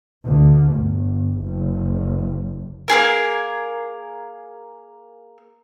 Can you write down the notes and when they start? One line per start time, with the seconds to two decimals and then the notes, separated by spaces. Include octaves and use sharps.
0.24 D2
0.75 G1
1.41 F#1
2.88 A#3 C#4 G#4 A#4